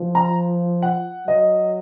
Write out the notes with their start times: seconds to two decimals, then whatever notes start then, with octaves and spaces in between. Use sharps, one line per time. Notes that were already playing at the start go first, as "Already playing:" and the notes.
Already playing: F3
0.15 A#5
0.82 F#5
1.27 F#3 D#5